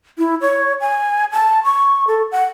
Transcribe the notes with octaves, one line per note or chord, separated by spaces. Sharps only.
E4
C#5
G#5
A5
C#6
A4
F#5